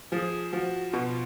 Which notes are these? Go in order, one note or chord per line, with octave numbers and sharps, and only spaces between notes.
F3 G#4
F3 F#4
B2 F4